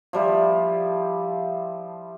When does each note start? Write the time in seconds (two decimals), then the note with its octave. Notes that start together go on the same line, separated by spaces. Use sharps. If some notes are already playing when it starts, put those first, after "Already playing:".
0.13 F3 G3 E4